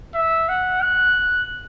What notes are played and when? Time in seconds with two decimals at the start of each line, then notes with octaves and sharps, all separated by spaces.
0.15 E5
0.49 F#5
0.83 F#6